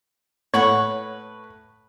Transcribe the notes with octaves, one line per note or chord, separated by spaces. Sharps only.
A2 B4 C#5 F#5 C#6